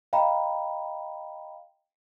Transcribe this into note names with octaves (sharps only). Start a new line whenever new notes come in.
D#5 F5 G5 A#5 B5